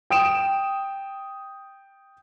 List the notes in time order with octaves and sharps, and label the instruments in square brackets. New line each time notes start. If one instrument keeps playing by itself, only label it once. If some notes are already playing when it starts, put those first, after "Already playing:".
[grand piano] G5 D#6 D7 E7